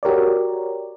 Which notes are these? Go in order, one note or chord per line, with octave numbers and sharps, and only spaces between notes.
F#4 G4 A#4 C#5 D5